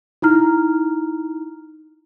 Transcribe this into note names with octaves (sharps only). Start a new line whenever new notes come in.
D#4 E4 A#5 F6